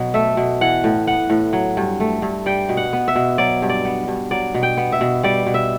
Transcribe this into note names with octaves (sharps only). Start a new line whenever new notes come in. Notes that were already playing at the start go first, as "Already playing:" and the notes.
Already playing: B2 F#3
A3 E5
B2
E3 F#5
A2
B3 F#5
A2
F#3
G2
A3
G2
G3 G5
B2
F#5
B3
E5
B2
F#3 D5
G2
D5
B3
G2
F#3 D5
B2
G5
B3
E5
B2
G3 D5
B2
E5